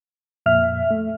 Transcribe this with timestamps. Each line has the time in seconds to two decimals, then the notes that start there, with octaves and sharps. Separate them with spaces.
0.46 F2 A#2 E5 F6
0.91 A3